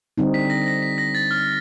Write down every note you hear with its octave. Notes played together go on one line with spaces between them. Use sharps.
D3 G3 C4 D#4
B6
A#6
A#6
B6
A#6
A6
F6